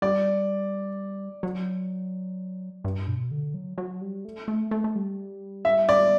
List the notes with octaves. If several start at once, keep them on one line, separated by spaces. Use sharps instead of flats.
G3 D5
F#3
G2
B2
D3
F#3
F#3
G3
A3
A3
A3
A3
G3
E5
D5